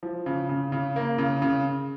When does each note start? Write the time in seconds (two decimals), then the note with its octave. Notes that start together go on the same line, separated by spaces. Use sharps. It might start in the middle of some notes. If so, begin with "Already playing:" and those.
0.03 F3
0.26 C#3
0.49 C#3
0.72 C#3
0.96 A#3
1.18 C#3
1.42 C#3